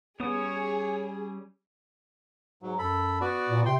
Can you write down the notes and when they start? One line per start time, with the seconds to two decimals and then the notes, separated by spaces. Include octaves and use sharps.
0.20 G3 B3 C#4 G#4 C#5 D#6
2.62 G#2 F#3
2.78 F#2 A4 B5
3.21 B3 F#4 D5
3.49 A#2
3.66 C3 G5 C6